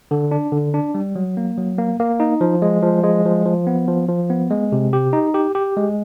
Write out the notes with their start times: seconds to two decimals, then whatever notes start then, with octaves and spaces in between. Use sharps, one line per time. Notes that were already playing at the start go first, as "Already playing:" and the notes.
0.11 D3
0.31 D4
0.52 D3
0.74 D4
0.95 G3
1.16 F#3
1.37 A#3
1.57 F#3
1.78 A#3
2.00 A#3
2.20 D#4
2.41 F3
2.62 G#3
2.83 F3
3.04 G#3
3.25 F3
3.45 F3
3.67 B3
3.88 F3
4.08 F3
4.30 B3
4.51 G#3
4.72 C3
4.93 G4
5.13 D#4
5.34 G4
5.55 G4
5.77 G#3